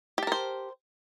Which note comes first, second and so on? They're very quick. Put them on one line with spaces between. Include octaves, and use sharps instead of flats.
G4 A5 A#4 C5